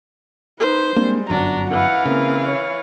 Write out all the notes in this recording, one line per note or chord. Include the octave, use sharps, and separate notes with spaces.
D#4 B4 C5
G3 G#3 A#3 C4 D4
G1 F#2 D4 F#4 A#5
E3 F5 F#5
C#3 A#3 C4
C#5